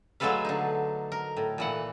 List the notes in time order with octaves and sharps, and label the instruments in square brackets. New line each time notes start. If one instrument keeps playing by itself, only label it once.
[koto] F#3 G#3 A3 A4 B4 F5
D3 D#4
A#4
A2
A#2 E3 F#5